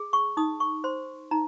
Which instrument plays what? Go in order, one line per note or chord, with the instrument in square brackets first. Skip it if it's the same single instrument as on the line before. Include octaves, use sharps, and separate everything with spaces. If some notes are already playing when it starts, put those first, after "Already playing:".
Already playing: [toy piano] G#4
C#6
D#4 D#6
C#6
C5 C6
D#4 A#5